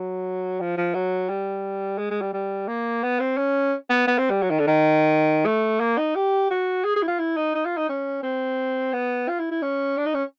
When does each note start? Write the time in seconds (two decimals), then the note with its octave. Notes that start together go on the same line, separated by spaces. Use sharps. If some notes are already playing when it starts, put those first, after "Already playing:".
Already playing: F#3
0.61 F3
0.78 F3
0.94 F#3
1.29 G3
1.98 G#3
2.11 G#3
2.21 G3
2.33 G3
2.68 A#3
3.03 B3
3.20 C4
3.38 C#4
3.90 B3
4.08 B3
4.18 C4
4.30 G3
4.42 F#3
4.50 D#3
4.59 D3
4.67 D#3
5.46 A3
5.80 A#3
5.98 D#4
6.15 G4
6.51 F#4
6.84 G#4
6.96 G#4
7.03 E4
7.08 F4
7.19 E4
7.37 D#4
7.55 D#4
7.66 F4
7.77 D#4
7.89 C#4
8.23 C4
8.93 B3
9.29 F4
9.39 E4
9.52 E4
9.62 C#4
9.98 D4
10.06 D#4
10.15 C#4